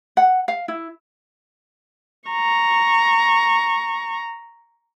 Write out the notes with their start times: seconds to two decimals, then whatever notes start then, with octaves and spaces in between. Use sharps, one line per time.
0.17 F#5
0.48 F5
0.68 E4
2.29 A#5 C#6